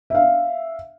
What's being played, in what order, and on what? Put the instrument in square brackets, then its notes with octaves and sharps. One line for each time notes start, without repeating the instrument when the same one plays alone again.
[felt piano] E5 F5